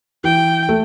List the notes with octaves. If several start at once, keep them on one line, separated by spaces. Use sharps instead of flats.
E3 G5
A3